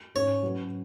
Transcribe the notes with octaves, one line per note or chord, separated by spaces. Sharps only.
G#2 G#3 C#4 G#4 C#5
F#3 C#4 F#4 B4